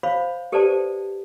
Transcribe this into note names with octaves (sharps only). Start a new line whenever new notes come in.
C5 C#5 F5 B5
G4 A4 B4 C5 D5 A5